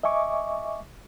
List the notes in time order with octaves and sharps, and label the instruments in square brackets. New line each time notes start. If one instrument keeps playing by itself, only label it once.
[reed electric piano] D#5 E5 G#5 C#6 D6